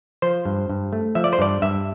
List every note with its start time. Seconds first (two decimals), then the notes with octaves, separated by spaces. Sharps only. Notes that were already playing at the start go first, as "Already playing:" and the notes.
0.22 F3 C5
0.45 G2
0.69 G2
0.93 A3
1.15 F3 E5
1.24 D5
1.33 C5
1.39 G2 D5
1.62 G2 E5